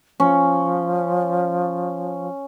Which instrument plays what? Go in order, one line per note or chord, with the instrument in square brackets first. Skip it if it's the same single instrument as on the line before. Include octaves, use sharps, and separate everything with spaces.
[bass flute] F3 [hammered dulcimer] C#4